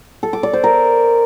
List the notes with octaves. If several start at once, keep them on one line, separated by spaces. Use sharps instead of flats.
A4
D6
D5
C5
A#4